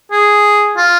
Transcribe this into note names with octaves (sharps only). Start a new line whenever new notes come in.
G#4
F4